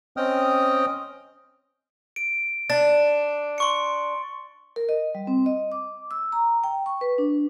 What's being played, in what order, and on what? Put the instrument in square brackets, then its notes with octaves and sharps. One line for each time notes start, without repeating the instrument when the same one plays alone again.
[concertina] C4 C#4 D#5 G5 D#6 F6
[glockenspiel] D7
[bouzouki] D4 [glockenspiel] A6
[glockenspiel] C6 C#6 C#7
[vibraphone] A#4
D#5
G3
C4
D#5
D6
E6
A#5
G5
C#6
B4
D4